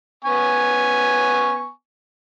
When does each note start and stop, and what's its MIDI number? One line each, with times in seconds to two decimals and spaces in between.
0.24 1.70 59
0.24 1.70 80
0.24 1.70 85